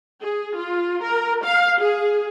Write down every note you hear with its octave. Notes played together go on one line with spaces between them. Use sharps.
G#4
F4
A#4
F5
G#4